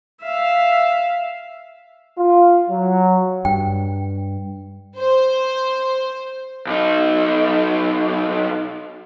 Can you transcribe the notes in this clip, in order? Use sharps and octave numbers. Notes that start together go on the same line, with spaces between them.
E5 F5
F4
F#3
G2 G5
C5
B1 D#4